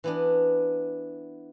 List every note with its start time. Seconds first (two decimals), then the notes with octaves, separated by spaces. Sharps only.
0.04 E3 B3 D4